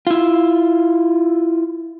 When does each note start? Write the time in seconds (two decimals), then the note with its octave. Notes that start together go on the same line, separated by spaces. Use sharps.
0.07 E4 F4